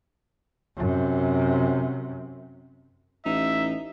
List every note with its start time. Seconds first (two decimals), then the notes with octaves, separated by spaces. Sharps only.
0.77 F#2 C3
3.25 A1 D#4 E5